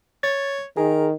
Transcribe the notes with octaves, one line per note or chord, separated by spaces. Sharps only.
C#5 A6
D#3 G#4 A#4